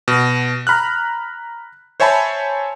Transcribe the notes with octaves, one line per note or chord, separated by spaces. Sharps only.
B2
A#5 B5 F6 F#6
C5 C#5 E5 G#5 A5 B5